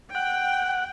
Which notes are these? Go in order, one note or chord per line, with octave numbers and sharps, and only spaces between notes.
F#5 G5